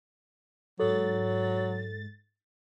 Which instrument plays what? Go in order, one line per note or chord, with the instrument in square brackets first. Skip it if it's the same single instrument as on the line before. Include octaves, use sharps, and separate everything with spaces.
[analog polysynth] G#2 A6 [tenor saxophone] F#3 [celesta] A4